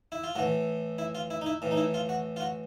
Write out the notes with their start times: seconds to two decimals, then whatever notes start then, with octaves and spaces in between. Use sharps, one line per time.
0.12 E4
0.24 F4
0.35 A2 E3 F#4
0.98 E4
1.15 F4
1.30 E4
1.41 D#4
1.46 E4
1.62 A2 E3
1.71 D#4
1.77 E4
1.94 F4
2.09 F#4
2.36 F4
2.41 F#4